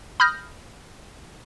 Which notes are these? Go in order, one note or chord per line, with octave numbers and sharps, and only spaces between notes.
B5 D#6 F6 G6 A#6